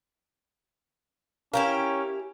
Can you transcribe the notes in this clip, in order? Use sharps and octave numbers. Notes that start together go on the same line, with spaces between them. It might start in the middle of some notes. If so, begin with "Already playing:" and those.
C#4 E4 G4 A#4 F5